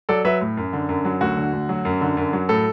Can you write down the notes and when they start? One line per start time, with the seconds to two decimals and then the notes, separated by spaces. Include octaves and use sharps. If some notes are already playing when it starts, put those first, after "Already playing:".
0.09 F#3 A4 D5
0.24 F#3 B4 E5
0.41 A2
0.57 F#2
0.73 D3
0.89 F#2
1.05 F#3
1.21 D2 F#4
1.37 D3
1.53 D2
1.69 F#3
1.85 F#2
2.01 D3
2.17 F#2
2.33 F#3
2.49 A2 A4